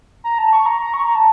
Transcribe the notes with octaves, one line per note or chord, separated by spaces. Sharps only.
A#5
A5
C#6
A#5
A#5
C#6
A#5
A5